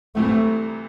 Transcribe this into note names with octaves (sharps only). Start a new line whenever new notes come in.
C2 C3 E3 A3 C4